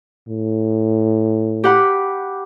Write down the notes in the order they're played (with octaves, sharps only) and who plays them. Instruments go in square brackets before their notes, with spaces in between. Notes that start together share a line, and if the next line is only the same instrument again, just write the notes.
[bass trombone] A2
[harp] G4 F#5 B5